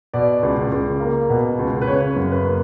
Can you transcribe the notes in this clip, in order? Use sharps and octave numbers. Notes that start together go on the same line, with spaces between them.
B2 D5
C#2
C#2
A#3
B2
C#2
B4
C#3 C#5
F#2
B4
A#3